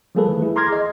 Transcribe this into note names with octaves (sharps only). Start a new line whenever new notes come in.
F3 G3 A#3 G#4 A4 B4
D#3 E3 A3
E4 G#4
A#5 C6 D6 F6 G#6 A#6
G#4 D#5 C6